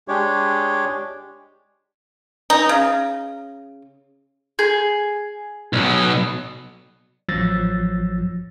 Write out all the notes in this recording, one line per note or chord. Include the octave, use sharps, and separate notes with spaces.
G#3 D4 G4 C#5
D#4
C#3
G#4
B1 B2
A1 F3 F#3 E6 A6 A#6